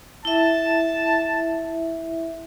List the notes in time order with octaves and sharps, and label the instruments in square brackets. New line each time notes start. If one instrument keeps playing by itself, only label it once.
[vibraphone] E4 E5 [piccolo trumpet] A5